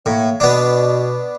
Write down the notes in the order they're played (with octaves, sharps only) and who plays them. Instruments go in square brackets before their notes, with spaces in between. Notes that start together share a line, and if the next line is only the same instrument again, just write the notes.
[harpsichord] A2 [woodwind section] A#3 C#5
[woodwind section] B2 [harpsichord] B3 D4